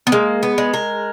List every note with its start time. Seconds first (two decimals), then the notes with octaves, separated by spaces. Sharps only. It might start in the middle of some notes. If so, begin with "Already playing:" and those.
0.07 B3
0.12 G#3 A#3
0.43 B3
0.58 G#3
0.74 A#4